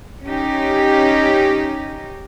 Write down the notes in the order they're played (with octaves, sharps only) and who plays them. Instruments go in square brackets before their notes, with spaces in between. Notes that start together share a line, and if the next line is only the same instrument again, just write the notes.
[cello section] C#4 D#4 G4